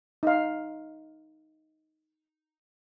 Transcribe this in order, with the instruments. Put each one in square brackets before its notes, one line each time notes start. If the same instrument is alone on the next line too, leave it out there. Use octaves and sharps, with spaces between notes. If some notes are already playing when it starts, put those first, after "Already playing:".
[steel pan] D#4 F5